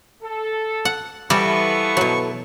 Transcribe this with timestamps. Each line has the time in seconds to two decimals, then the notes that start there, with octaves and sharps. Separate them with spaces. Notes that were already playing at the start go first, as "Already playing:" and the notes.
0.22 A4
0.85 F#5
1.30 E2 E3 F3 G3 B3 A4 C#6
1.97 B2 F#3